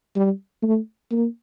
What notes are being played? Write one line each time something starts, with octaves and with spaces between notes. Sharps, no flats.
G3
A3
A#3